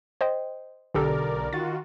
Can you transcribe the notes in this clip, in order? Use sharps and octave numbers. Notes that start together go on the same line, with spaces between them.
C5 D#5 G5
B1 D3 G4 A4 A#4 D5
D#3 F4 F#4 A6